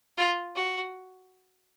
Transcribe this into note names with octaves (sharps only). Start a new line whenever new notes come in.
F4
F#4